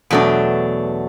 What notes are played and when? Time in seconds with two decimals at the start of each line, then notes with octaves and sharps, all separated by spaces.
0.11 E2 B2 F#3 A3 D4